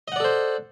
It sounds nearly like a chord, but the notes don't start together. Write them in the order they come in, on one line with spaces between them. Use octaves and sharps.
D#5 F#5 D5 A4 C5